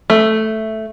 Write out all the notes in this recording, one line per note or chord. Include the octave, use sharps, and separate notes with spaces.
A3